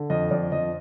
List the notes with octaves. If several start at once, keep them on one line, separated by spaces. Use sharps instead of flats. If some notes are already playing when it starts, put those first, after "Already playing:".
Already playing: D3
F2 D#5
F2 D5
F2 D#5